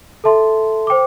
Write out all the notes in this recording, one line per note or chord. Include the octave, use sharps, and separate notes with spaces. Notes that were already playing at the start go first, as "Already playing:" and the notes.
A4 E5 A5 C6
C5 G5 D6